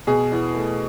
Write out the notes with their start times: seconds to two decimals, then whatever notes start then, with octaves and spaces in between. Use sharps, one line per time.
0.07 B2 G#4
0.32 E2
0.54 A3